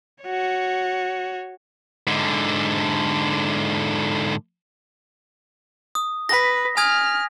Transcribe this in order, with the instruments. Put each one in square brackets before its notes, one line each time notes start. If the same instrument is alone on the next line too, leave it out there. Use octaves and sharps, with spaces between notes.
[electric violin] F#4 C#5
[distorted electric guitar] G#2 D3
[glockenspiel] D#6
[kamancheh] B4 [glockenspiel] A#6 B6
[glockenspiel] G#5 D#6 G#6 [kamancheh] F6